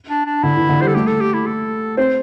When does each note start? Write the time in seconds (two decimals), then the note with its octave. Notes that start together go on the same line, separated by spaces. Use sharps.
0.10 D4
0.26 D4
0.43 D3 E4
0.57 E3
0.69 D3
0.81 G3 C5
0.88 A4
0.94 A3 G4
1.07 A4
1.21 G4
1.33 E4
1.46 A4
1.97 C4 C5